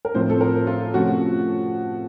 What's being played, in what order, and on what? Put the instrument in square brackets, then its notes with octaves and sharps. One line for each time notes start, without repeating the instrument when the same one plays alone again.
[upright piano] A#4
A2 F3 C4 C5
A4
A#4
F4
C3 F3 A3 C#4 F#4